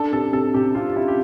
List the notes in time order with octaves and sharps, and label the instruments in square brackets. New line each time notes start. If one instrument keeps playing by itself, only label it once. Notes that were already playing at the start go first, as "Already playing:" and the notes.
Already playing: [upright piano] D4 [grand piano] A4
[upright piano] C3 [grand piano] A4
[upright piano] C3 [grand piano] A4
[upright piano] C3 [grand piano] G4
[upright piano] C3 [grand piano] F4
[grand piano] F4
[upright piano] C3 [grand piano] E4
[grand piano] G4